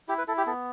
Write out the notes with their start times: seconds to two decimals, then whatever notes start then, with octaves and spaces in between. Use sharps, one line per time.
0.08 E4 G4
0.18 B4
0.28 E4 A4
0.38 G4
0.47 B3 A4